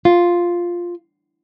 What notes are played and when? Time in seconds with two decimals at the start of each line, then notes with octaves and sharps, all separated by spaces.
0.05 F4